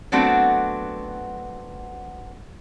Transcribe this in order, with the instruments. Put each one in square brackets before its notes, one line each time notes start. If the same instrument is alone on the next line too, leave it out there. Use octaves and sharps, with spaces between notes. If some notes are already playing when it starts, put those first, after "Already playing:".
[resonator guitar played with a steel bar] F#3 A3 B3 C4 D4 F#4